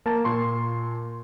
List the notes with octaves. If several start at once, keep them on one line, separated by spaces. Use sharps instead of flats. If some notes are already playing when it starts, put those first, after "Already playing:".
A#3 A#4 A5
A#2 C6 C#6